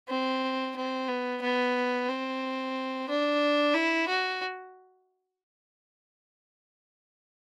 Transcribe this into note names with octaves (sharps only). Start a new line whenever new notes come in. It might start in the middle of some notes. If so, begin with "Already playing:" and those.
C4
C4
B3
B3
C4
D4
E4
F#4